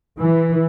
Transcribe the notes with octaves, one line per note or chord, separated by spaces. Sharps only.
E3